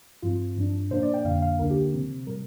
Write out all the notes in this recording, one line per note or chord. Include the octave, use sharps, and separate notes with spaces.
G2 F3 C4 F4
G2 F3 D4
A#2 A#3 D4 C5
D5
G5
F2 D3 A#3 D4 F5
F5
D2 D3 A#3 D4 A#4
G4
C3 F3 C4
A#2 G3 A#4